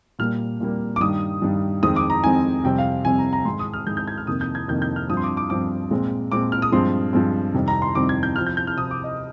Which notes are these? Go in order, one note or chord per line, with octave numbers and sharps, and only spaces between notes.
A#2 G3 A#3 F6
A#2 G3 A#3
D6
G2 D#3 G3 D#6
G2 D#3 G3
F2 D#3 G#3 C4 D#6
D6
A#5
F2 D#3 G#3 C4 G#5
F2 C3 G3 C4 G5
F5
F2 C3 G3 C4 G#5
A#5
A#5
G#2 D#3 G#3 C6
D#6
F6
G#2 D#3 G#3 G6
G6
G#6
F6
F2 C3 D#3 A#3 D#6
G6
G#6
F2 C3 D#3 A#3 G6
G6
F6
G2 F3 C4 D#6
C6
D6
D6
G2 F3 C4 D6
A#2 G#3 C4
A#2 G#3 C4 D6
F6
D#6
G2 F3 G#3 C4 C6
G2 F3 G#3 C4
F2 C3 D#3 G3 C4
A#5
C6
F2 C3 D#3 G3 C4 D6
G#6
G6
C3 F3 C4 F6
G6
G6
F6
C3 F3 C4 D#6
D6
D#5